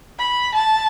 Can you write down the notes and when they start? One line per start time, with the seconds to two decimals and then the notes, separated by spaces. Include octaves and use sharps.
0.19 B5
0.54 A5